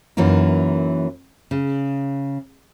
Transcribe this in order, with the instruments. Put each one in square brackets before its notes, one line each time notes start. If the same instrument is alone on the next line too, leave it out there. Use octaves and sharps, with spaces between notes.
[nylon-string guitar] F#2 E3 F#3 A#3 D#4
C#3